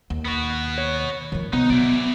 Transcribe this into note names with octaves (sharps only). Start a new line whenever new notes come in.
D#2
B3 F#4
C#5
D#3 F3
C3 B3 D#4
F#3 E4 D5